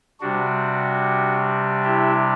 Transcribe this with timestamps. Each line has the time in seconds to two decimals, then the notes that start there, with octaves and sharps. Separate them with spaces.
0.20 C3 G3 D4 F#4
1.84 E4 G4